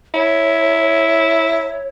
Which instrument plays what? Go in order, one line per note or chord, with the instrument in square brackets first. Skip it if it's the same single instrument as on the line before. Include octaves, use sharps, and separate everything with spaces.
[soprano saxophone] E4 [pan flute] C#5